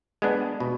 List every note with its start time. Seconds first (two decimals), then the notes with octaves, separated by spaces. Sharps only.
0.22 G#3 B3 D4
0.60 B2